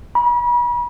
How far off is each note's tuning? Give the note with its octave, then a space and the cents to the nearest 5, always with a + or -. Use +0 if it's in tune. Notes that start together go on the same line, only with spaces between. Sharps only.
B5 -40